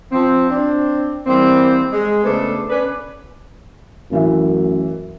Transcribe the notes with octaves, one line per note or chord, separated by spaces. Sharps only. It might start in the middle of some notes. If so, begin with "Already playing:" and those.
F3 C4
C4 D4
E3 G3 A#3 C4
G#3 G#4
C#3 A3 B3 D4 A4 C5
C#4 D4 B4
A1 F#2 E3 E5